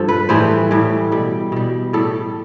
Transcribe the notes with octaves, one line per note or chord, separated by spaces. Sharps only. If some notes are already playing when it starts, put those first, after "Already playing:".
Already playing: G2 F3 A4
B4
A2 E3 G3 C5
A2 E3 G3
B2 G3
B2 G3
A2 G3 A4